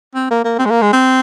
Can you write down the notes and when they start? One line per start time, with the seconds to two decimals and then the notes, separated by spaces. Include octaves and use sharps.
0.15 C4
0.30 A#3
0.44 A#3
0.59 C4
0.65 G#3
0.70 A#3
0.82 G#3
0.93 C4